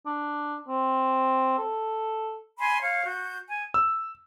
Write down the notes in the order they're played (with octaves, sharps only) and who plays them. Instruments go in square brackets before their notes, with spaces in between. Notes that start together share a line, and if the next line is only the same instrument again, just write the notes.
[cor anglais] D4
C4
A4
[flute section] G#5 B5 C6
C#5 F5
F#4 G6
G#5
[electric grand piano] E6